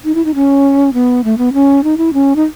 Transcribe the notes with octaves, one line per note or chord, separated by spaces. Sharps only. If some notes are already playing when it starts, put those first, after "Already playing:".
D#4
E4
D#4
C#4
B3
A3
B3
C#4
D#4
E4
C#4
D#4